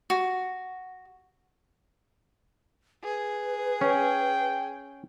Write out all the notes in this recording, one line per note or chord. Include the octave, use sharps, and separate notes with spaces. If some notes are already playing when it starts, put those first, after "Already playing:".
F#4
G#4 B4
C#4 G5